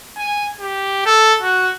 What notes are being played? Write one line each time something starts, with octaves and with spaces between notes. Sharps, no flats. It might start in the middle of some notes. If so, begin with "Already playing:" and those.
G#5
G4
A4
F#4